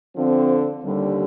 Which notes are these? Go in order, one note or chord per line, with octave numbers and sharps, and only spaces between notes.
D3 F3 C4
D#2 D3 G3